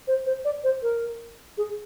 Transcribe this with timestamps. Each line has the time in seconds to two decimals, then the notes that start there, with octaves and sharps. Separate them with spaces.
0.08 C5
0.26 C5
0.45 D5
0.64 C5
0.83 A#4
1.58 G#4